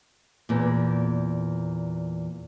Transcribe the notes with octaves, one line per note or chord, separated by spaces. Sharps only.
E2 A#2